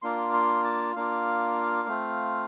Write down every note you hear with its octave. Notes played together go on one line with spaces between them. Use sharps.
A#3 D4 F4 C6
C6
A5
A#3 D4 F4 F5
A3 C4 F4